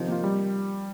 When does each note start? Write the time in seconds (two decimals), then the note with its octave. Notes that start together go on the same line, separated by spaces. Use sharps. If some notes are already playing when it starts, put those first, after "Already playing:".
Already playing: C3 D#3 F3
0.08 A#3 F4
0.24 G3